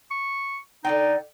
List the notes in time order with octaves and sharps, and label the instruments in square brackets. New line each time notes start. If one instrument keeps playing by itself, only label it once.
[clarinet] C#6
[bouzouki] D3 D5 G5 [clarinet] D#4